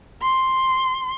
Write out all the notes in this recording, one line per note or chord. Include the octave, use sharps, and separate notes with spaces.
C6